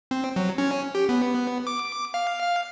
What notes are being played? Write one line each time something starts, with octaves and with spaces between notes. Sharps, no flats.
C4
F#3
C#4
G4
B3
D6
F5
F5